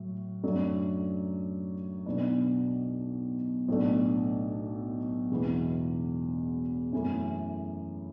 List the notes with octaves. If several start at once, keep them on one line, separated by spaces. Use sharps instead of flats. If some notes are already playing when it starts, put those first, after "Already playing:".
Already playing: A2 F#3
F#2 F#3 A3 D4
B1 B2 B3 D4
B1 A2 A3 D4
E1 E2 B2 B3 E4
F#2 E3 A3 E4